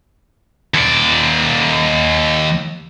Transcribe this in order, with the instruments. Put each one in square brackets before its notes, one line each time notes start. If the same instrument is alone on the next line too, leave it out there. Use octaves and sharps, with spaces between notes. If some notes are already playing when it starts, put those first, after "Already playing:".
[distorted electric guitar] D#2 D5